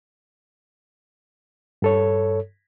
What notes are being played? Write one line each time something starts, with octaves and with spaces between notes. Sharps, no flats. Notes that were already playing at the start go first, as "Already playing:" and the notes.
G2 A4 C#5